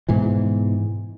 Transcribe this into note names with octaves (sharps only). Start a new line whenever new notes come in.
G#2 B2 E3